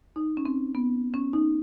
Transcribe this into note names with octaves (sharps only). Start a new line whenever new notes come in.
D#4
C#4
C4
B3
C#4
D#4